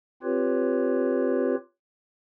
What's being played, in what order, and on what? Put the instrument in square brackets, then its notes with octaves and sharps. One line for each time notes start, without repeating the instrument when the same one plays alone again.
[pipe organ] C4 F4 G4 B4 C#5